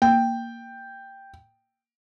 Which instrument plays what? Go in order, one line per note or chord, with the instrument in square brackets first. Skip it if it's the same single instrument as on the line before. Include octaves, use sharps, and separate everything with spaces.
[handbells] A#3 [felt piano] G5